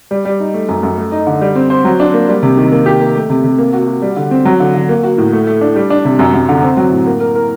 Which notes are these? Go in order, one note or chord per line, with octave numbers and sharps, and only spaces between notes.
G3
G3
D#4
A3
F#2
F#2
A3
D#4
D3
G3
C4
C5
F#3
D4
A#3
G3
C3
D#3
A#3
G4
A#3
A3
C3
C3
A#3
F#4
F#4
G3
D3
C4
F#3
D3
D3
A#3
F#4
A2
A3
A3
D4
G3
D4
C3
F#2
F#2
D3
C4
F#3
A2
A#3
A#4
A#4